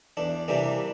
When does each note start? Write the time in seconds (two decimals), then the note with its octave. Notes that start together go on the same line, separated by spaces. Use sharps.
0.17 E2 D4
0.48 C3 E3 G3 A#3 D4